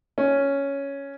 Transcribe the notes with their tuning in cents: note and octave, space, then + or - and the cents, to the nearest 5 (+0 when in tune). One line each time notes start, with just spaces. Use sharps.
C#4 +5